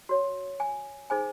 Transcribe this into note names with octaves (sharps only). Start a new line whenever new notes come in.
F#4 C#5
G#5
D#4 G#4 C5 G#5